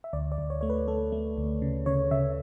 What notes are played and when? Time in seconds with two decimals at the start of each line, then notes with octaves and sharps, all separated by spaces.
0.04 E5
0.13 D2 D5
0.32 D5
0.38 D2
0.50 C#5
0.61 A3 C#5
0.69 B4
0.88 A3 A4
1.12 A3
1.37 D2
1.62 C#3
1.86 C#3 C#5
2.11 C#3 E5